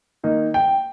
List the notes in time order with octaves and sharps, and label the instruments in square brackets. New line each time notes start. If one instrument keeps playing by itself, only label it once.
[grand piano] D#3 A#3 D#4
G5